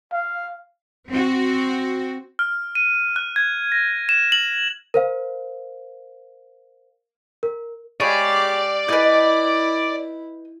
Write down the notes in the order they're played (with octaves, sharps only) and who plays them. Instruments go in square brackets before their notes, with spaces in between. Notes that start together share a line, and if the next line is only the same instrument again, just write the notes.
[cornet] F5
[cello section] C4 F#4
[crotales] F6
D#7
F#6
G#6
A#6
E7
F#7
[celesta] A#4 C5 F5
A#4
[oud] G#3 [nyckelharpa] G4 F5 [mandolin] G#4 C#5 B5 [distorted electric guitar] D5
[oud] D#4 G#4 D#5 [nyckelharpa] E4 [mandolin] B4 G6